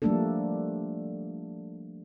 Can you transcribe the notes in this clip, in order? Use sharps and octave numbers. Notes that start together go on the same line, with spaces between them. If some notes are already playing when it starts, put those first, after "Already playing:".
F3 G3 A3 A#3 D4 A4